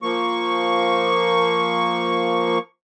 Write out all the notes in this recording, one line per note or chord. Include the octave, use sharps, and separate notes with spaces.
F3 A#3 C#6